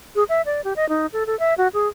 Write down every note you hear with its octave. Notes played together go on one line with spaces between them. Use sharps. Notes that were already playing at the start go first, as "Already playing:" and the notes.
G#4
E5
D5
G4
D#5
D#4
A4
A4
E5
F#4
G#4